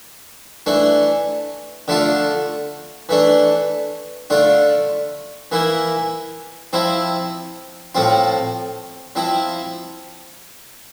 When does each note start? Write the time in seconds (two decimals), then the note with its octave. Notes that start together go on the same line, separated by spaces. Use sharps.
0.66 E3 A3 D4
1.88 D3 A3 D4 F4
3.09 E3 A3 D4
4.30 D3 A3 D4 F4
5.52 E3 A#3 E4
6.73 F3 C4 E4
7.95 A2 F3 C4 F4
9.15 F3 C4 E4